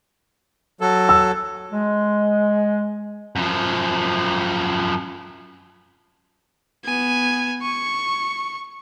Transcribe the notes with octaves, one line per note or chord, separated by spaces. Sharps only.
F#3 A4
E6
G#3
F#2 F3
B3 G#5
C#6